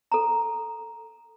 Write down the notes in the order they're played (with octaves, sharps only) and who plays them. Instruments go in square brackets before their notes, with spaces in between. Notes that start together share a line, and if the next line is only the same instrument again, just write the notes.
[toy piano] A4 A#5